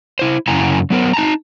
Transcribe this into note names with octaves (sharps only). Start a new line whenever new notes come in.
E4 C5
F#2 C#3 E4 F#5 G#5 A#5
F#3 B3 A#4 C5
D#4 A5 A#5